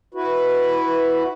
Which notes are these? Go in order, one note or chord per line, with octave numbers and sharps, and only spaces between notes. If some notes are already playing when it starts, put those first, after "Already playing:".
E4 F#4 B4